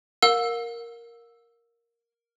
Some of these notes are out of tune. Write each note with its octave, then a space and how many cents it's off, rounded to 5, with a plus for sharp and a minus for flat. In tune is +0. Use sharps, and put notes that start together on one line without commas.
A#4 +0 F5 +40 E6 +0